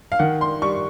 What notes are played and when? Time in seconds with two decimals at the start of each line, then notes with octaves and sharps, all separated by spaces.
0.12 F5
0.19 D#3 F#5
0.41 C6
0.62 G3 C#6